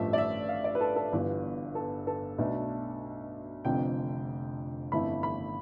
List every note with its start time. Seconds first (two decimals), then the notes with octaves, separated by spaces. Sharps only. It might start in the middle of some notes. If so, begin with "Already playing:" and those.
Already playing: A1 G2 F3 A3 E5
0.13 D5
0.18 E5
0.49 F5
0.64 D5
0.75 B4
0.81 A4
0.96 A4
1.12 G1 G2 E3 B3 F4 B4
1.75 A4
2.07 A4
2.38 B1 B2 A3 D4
3.65 F1 F2 D3 F3 G5
4.92 G1 F2 E3 A3 E4 B5
5.23 B5